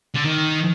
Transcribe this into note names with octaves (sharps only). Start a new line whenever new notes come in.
D3
D#3